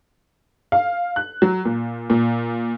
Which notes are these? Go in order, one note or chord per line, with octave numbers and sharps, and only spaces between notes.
F5
F#6
F#3
A#2
A#2